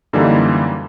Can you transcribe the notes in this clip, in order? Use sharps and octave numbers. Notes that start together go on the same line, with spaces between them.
F#2 D3 E3 G3 A#3 D#4